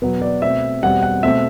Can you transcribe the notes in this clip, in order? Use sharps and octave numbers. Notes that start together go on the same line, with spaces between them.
E2 B2 F#3 B4
D5
B2 A3 C4 E5
E2 B2 G3 C4 F#5
F#5
B2 A3 C4 E5